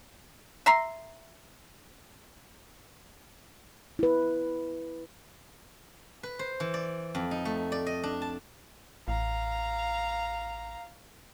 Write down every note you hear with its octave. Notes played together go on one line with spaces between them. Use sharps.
E5 A#5 C6
E4 B4
B4
C5
E3
D5
F2
D#4
A3
D5
D#5
D4
A5
A1 F5 A#5